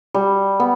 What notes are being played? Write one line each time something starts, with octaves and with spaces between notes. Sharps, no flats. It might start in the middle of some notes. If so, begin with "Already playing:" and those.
G3
B3